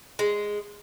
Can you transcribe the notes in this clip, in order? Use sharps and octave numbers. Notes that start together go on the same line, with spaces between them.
G#3